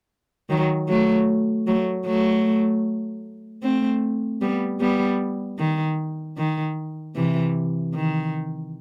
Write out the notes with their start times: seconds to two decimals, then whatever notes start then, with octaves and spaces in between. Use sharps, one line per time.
0.50 D#3 F#3
0.89 F#3 A3
1.67 F#3 A3
2.06 F#3 A3
3.63 A3 C4
4.41 G3 B3
4.81 G3 B3
5.59 D#3
6.38 D#3
7.16 C3 E3
7.94 D#3